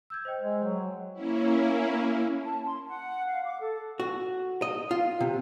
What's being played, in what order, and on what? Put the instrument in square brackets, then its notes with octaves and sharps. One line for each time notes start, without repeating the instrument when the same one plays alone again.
[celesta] E6 G6 G#6
C5 D#5 G5
[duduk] G#3
F#3
[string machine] A#3 C#4 E4
[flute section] A5
C6
F#5
F5
D6
A4
[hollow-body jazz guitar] F#4
D#5
F4
C3